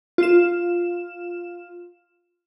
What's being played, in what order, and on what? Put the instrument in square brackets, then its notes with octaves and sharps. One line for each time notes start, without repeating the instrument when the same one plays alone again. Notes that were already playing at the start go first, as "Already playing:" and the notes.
[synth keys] F4 E7